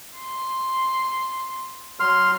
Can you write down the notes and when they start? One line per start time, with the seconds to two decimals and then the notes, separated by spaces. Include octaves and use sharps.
0.19 C6
2.00 F#3 C6 F6